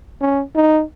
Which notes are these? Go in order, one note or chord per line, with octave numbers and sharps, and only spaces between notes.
C#4
D#4